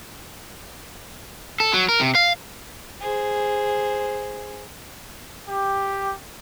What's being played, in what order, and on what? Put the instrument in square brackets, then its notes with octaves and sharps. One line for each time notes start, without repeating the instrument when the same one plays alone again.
[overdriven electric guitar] A4
F#3
A#4
C3
F5
[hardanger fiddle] G#4 C5
[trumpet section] G4